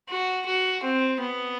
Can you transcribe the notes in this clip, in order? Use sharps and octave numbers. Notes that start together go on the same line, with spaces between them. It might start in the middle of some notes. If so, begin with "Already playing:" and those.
F#4
F#4
C4
B3